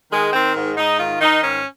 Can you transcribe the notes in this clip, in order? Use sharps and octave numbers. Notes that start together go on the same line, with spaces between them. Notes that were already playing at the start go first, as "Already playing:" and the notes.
D#3 G#3
D#3 C4
G#2
G#2 D#4
D#3 F4
D#3 D#4
G#2 C#4